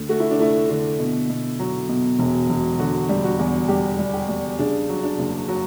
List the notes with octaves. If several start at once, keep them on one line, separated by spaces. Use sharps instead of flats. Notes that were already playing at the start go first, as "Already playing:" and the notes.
Already playing: D2 D3
A3 F#4
E4
D4
A3 E4
D3
B2
B2
F#3
B2
E1
E1
D3 F#4
G3
F#4
E2
G3 G4
G3
G4
G3
C#3 D4
F#3
D4
F#1
F#3